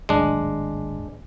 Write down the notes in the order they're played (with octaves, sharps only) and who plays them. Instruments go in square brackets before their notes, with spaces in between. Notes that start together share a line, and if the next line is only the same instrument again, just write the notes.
[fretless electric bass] D1 [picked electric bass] G#1 D#2 [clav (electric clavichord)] G#3 D4